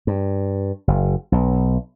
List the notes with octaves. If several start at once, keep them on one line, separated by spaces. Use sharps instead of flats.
G2
F#1
B1